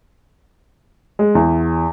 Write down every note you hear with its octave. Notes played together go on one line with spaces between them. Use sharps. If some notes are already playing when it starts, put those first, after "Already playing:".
G#3
E2